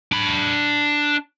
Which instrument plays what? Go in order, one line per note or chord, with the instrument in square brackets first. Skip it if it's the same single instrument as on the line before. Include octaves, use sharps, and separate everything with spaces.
[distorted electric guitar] D4 B5